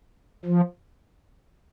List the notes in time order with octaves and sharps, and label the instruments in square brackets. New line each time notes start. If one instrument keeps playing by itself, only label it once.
[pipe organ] F3